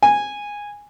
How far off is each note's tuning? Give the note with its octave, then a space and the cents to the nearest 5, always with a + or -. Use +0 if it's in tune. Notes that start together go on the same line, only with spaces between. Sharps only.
G#5 -10